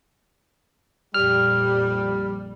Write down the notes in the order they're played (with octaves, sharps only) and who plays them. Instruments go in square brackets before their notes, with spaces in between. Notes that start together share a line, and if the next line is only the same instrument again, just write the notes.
[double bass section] A#1 F2 A#2 [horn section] G3 [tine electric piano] F6